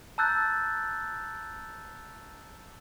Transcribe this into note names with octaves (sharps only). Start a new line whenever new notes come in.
A5 A#5 E6 F#6 G6 A6